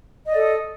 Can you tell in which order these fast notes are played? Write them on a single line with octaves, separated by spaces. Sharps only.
D#5 D5 A4 D#6